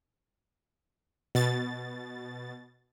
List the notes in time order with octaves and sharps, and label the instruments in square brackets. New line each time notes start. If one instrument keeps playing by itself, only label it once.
[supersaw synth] B2 A6